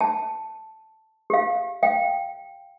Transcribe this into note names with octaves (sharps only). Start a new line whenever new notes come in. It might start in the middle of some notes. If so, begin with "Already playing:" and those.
A5
G4 F5
F5 G5